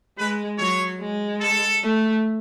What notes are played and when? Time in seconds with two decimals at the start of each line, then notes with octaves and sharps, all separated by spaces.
0.18 G#3 B4
0.59 F#3 C#5
1.00 G#3
1.41 A4
1.83 A3